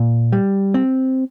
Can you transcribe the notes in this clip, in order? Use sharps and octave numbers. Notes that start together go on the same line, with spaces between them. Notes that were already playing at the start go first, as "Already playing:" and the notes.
Already playing: A#2
G3
C4